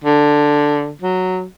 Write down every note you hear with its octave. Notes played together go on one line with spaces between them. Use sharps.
D3
F#3